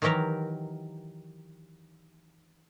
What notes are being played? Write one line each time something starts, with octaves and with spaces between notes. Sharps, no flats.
D#3 E3 F#3 G4 A#4